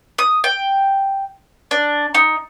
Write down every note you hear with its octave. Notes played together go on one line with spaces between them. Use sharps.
D#6
G5
D4
D#4